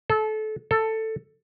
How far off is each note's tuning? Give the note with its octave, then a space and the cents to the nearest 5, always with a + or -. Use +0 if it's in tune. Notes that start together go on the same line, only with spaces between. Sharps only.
A4 -25
A4 +10